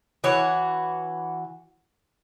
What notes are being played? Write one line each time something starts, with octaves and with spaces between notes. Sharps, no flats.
E3 F#4 C#5